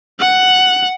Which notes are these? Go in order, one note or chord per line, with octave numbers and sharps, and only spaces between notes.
F#5 F#6